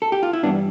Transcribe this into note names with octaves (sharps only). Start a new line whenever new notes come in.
A4
G4
F4
E4
G2 E3 G3 B3 D4